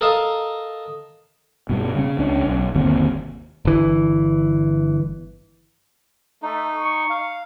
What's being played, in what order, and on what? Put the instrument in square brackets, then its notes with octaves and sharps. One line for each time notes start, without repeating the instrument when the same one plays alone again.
[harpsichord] A4 A#4 D#5 F5 A5 A#5
[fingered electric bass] G2 B2
C#3 C#4
C#2 C#4 D4
B1
G1 D#2 C3
[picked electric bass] G1 E3
[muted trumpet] A3 [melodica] D#4
[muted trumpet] C#6
[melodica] F5